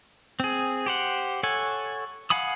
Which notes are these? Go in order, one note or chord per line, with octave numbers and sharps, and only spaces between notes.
C4 G#4
G4 C5 F#5
A4 C#5 F#5 G#5
F5 F#5 G#5 B5 D#6